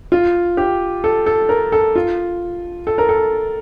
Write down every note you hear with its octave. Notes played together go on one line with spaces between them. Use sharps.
F4
G4
A4
A4
A#4
A4
F4
A4
A#4
A4